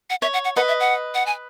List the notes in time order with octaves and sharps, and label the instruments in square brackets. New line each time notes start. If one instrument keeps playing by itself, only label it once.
[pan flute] F#5
[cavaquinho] C#5 [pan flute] E5
[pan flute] F#5
F#5
[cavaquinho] B4 D#5 [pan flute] F#5
[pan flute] E5
F#5
F#5
G#5